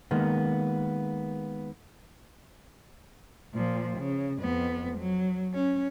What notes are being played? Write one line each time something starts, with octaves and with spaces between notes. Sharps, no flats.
D#3 G#3 A#3 B3
A#2 F3
C#3
F2 B3
F#3
C#4